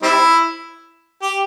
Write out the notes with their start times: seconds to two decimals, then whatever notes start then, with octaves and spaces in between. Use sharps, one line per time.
0.02 G3 C4 E4
1.22 G4